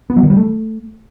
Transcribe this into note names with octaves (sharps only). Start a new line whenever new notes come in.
B3
F#3
D#3
G3
A3